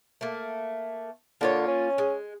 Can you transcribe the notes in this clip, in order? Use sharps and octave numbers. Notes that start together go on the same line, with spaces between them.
A3 A#3
D3 A#3 F4 C#5
C#4
G#3